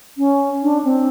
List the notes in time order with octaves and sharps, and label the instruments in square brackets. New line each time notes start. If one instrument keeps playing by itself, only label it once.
[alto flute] C#4
D4
C4